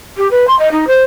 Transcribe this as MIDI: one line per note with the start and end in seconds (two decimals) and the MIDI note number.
0.17 0.29 67
0.30 0.45 71
0.47 0.55 84
0.59 0.70 75
0.71 0.85 63
0.87 1.02 72